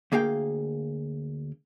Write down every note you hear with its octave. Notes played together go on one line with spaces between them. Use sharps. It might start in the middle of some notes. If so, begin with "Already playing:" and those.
D2 A#3 G#4 F5 G5